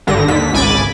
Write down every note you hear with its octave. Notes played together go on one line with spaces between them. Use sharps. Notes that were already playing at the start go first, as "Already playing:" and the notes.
G#1 G2 D3 A#6
D#2 D3 B6
G#1 C#2 G#5 B5 D6 A6